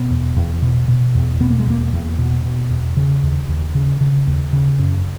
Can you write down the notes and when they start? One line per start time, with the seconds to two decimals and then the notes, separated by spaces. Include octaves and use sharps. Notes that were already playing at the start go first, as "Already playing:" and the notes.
Already playing: B2 B3
0.10 E2
0.36 E2
0.62 B2
0.88 B2
1.15 E2
1.40 B2 B3
1.50 A#3
1.59 G#3
1.66 E2 A#3
1.92 E2
2.18 B2
2.45 B2
2.70 E2
2.97 C#3
3.23 D#2
3.48 D#2
3.75 C#3
4.01 C#3
4.27 D#2
4.53 C#3
4.79 F#2